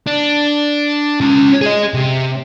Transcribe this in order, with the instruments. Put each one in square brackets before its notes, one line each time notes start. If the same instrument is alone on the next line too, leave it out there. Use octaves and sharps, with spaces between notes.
[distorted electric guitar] D4
C#4 F4
G#4 D#5
C3